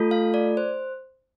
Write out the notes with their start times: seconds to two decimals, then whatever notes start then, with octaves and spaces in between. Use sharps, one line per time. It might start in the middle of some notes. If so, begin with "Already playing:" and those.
Already playing: A3 F4 A4
0.11 F5
0.34 D5
0.57 C5